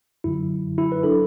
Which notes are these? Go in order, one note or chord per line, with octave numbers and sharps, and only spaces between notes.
F#2 D3 F#3 E4
E4
B4
F#3 D4 E4 A4